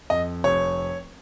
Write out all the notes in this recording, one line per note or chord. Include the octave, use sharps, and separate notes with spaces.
F2 D#5
F1 C#5